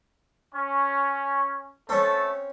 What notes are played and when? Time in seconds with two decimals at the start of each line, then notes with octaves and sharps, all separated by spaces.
0.55 C#4
1.89 A3 C4 C#4 A4